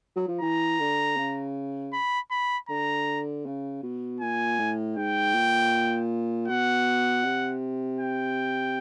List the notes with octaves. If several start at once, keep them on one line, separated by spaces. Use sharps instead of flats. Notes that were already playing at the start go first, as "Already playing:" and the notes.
F#3
F3
E3 A#5
D3
C#3
B5
B5
D3 A#5
C#3
B2
A#2 G#5
A2
G#2 G5
A#2
B2 F#5
C3
G5